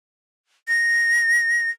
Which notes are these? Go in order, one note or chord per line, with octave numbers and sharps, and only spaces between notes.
A#6